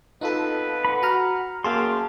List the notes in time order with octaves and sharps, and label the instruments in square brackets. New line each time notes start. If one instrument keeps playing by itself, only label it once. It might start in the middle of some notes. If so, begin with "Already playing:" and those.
[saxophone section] F2 B3 B4 [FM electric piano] D#4 F4 A4
[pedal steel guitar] F#5 B5
[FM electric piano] F#4 A#5 F6
[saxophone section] F#2 F5 [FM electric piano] A#3 G#4 [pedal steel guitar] G5 A5 C6